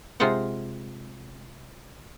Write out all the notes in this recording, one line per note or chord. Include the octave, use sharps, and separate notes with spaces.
C3 G#3 F4 C5 F#5